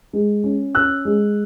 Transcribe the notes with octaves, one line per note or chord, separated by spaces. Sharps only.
G#3
C#4
C#4 E6 F#6
G#3